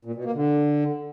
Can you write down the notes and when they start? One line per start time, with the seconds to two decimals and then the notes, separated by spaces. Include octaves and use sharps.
0.05 A#2
0.15 B2
0.25 A#3
0.34 D3